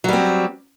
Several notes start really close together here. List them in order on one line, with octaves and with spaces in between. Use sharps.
F#3 G3 C4